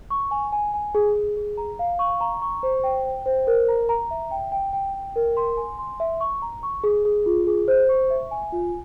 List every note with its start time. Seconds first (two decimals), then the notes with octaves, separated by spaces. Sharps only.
0.10 C#6
0.31 G#5
0.52 G#5
0.74 G#5
0.95 G#4
1.15 G#4
1.37 G#4
1.57 A#5
1.79 F5
1.99 C#6
2.21 A#5
2.42 C#6
2.63 C5
2.84 G5
3.05 G5
3.26 C5
3.47 A#4
3.68 A#5
3.89 A#5
4.11 E5
4.31 G5
4.52 G5
4.73 G5
4.95 G5
5.16 A#4
5.37 C6
5.57 G#5
5.79 C6
6.00 E5
6.20 C#6
6.42 A#5
6.63 C#6
6.84 G#4
7.05 G#4
7.26 F4
7.47 G#4
7.68 C5
7.89 C#6
8.10 E5
8.31 G#5
8.52 F4